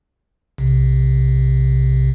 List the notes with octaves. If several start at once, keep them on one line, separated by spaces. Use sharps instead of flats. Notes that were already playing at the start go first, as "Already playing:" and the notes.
B1 C3